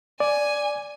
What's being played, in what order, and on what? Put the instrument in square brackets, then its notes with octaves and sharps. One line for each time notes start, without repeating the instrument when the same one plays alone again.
[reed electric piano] D5 [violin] G#5